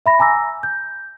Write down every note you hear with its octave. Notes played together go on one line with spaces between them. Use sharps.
E5 B5 A#6
G#5 A#5 D6 E6 A#6
G6